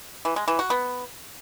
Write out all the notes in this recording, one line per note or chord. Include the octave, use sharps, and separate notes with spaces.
E3
G#3
E3
F#4
B3